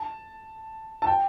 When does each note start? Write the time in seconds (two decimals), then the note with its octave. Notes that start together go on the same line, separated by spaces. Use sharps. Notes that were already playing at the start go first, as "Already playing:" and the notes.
Already playing: A5
1.02 A5
1.07 G5